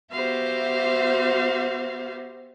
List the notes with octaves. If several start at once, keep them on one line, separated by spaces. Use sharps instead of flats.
B3 F#4 G4 C5 E5 F5